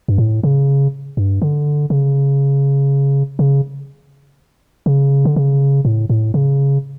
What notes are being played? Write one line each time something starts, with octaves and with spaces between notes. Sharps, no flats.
G2
A2
C#3
G2
D3
C#3
C#3
C#3
D3
C#3
A2
A2
C#3